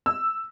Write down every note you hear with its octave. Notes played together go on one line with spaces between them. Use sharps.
E6